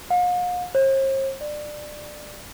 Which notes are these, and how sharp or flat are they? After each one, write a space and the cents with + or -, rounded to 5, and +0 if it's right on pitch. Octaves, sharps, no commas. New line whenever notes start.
F5 +45
C5 +45
D5 +20